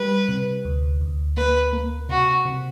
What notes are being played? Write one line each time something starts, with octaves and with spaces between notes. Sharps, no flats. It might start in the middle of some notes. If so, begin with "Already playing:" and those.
Already playing: G3 B4
C3
D2
D2
A#3 B4
A#3
C3 F#4
C3